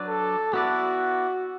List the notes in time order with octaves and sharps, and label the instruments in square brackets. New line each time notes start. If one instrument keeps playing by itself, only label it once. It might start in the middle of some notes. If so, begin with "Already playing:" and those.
Already playing: [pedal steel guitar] F#3 D4 B4 D5
[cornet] A4
[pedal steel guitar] B3 E4 B4 D5 [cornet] F#4